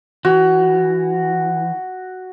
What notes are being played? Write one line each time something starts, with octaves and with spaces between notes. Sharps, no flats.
E3 F#4